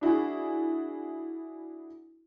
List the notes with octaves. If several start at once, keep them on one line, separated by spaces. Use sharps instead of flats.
D4 E4 F#4 G#4